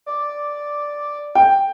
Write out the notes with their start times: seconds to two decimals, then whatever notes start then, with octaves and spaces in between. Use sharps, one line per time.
0.06 D5
1.35 G5